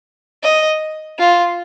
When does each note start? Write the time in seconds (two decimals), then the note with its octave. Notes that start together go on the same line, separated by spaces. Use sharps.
0.43 D#5
1.18 F4